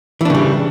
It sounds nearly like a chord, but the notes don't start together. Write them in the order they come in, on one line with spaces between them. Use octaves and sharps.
E3 D4 C#3 G3